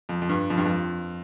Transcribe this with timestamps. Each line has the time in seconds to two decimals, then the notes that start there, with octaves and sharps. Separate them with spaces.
0.09 F2
0.22 F2
0.29 G2
0.50 F2
0.57 G2
0.65 F2